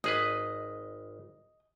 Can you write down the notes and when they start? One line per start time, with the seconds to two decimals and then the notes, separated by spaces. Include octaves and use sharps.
0.04 G#1 G#4 B4 D#5